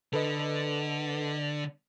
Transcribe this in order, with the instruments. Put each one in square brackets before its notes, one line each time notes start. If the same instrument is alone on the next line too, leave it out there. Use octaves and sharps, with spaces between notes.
[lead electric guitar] D3 [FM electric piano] A4 B4 D#5